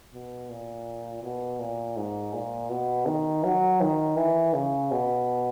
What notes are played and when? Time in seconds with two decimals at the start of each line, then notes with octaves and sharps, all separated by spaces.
0.14 B2
0.50 A#2
1.23 B2
1.60 A#2
1.97 G#2
2.34 A#2
2.70 B2
3.06 D#3
3.44 F#3
3.81 D#3
4.17 E3
4.54 C#3
4.91 B2